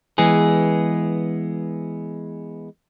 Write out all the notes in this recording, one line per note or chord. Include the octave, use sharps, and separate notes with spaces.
E3 G#3 B3 G#4